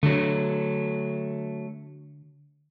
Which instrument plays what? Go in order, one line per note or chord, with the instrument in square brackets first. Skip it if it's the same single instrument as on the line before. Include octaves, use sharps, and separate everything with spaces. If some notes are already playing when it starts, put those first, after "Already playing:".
[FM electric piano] D3 [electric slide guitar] F#3 A3